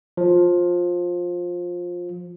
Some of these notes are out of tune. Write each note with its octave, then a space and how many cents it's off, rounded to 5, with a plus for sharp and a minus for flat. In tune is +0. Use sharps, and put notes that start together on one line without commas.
F3 +15